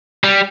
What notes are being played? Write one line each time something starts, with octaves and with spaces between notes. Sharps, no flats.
G3